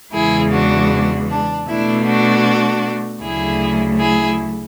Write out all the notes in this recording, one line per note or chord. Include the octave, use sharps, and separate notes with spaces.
E2 C#3 E3 G#3 E4 G#4
D4 F#4
D4
B2 A3 D4 E4
D4 F#4
D2 C#3 F#3 A3 E4 G#4
E4 G#4